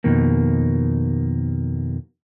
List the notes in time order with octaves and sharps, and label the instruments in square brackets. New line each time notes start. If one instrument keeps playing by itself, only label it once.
[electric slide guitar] F2 B2 D#3 A#3